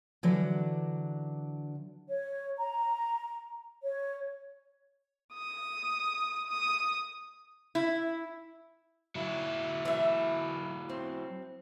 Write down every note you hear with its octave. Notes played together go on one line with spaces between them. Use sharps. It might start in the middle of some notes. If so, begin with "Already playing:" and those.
D3 E3 F#3 D4
C#5
A#5
C#5
D#6
D#6
E4
F#3 E4
E3 E5
C4